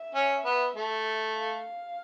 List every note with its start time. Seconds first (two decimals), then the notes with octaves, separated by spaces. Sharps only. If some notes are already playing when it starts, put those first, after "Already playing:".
Already playing: E5
0.15 C#4
0.45 B3
0.76 A3
1.36 F5